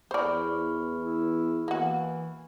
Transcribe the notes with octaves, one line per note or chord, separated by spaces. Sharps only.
E2 C5 D5 B5 C#6 F6
E4
E3 A#3 F#4